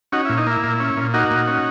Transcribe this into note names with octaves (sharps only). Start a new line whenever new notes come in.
C#4 D#4 F#4
E4
A#2
D#4
A#3 E4
A#2
C#4
A#2
A#3 D#4 F#4
A#2
C#4